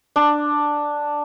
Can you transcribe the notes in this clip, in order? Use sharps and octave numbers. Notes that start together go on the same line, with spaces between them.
D4